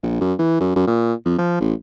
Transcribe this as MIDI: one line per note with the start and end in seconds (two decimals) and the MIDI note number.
0.03 0.20 34
0.21 0.33 42
0.39 0.60 52
0.60 0.71 42
0.76 0.85 42
0.87 1.14 46
1.25 1.35 41
1.38 1.56 53
1.61 1.74 33